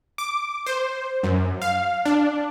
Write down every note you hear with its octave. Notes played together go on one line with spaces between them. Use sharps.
D6
C5
F#2
F5
D4